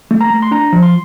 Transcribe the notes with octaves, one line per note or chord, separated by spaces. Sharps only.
A3
A#5
A3
C6
D4 A#5
F3
C6